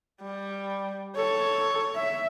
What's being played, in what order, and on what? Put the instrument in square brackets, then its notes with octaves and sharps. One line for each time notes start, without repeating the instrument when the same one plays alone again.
[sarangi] G3
[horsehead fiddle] A4 [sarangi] C#5
[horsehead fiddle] E5